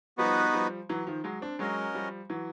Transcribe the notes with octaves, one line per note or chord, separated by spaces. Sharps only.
F3 G3 B3 D#4 F#4 B4
F3 G3
E3 F#3
D#3 F3
F#3 G#3
C4 D4
F#3 G#3 C#4 F#4 A#4 D#5
F3 G3
E3 F#3